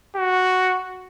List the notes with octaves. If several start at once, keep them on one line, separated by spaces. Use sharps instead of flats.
F#4